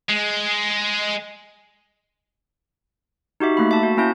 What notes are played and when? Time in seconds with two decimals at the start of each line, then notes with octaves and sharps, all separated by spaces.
0.09 G#3
3.40 D#4 F#4 G4 E5
3.57 A3 A#3 B5
3.71 E5 A5
3.83 F#4
3.97 A#3 C#4 E4 A5 G6